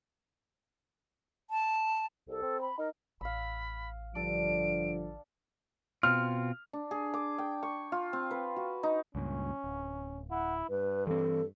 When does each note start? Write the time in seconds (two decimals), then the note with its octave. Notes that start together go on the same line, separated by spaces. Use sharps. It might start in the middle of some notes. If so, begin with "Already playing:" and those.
1.50 A5
2.28 C2 A4
2.42 C4
2.60 B5
2.79 D#4 A#4
3.21 A1 F5 B5 E6
4.15 G2 D3 F3 D4 A4 D7
6.03 B2 C4 F4 F6
6.73 D4
6.91 G#4
7.14 D6
7.38 G5
7.63 C#6
7.92 F4
8.13 C4
8.31 B4
8.56 F#4
8.83 D#4
9.15 C#2 G2 A#2 C#4
9.64 D1
10.31 E4 F#5
10.70 G2 B4
11.07 E3 C4 A4